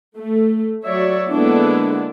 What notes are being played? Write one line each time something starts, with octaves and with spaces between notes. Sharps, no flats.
A3
F#3 C#5 D5 E5
D3 G#3 A#3 B3 D4 E4